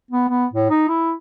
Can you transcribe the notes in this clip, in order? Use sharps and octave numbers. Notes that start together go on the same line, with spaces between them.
B3
B3
A2
D#4
E4